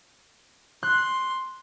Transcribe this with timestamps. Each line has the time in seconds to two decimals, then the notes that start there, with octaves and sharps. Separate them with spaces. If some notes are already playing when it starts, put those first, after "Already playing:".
0.83 C6 F#6